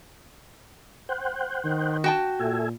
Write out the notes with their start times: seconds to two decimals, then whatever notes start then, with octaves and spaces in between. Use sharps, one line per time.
1.09 C5 F#5 G5
1.64 D#3
2.04 F#4 G5 A5
2.39 A#2 A4 E5 G#5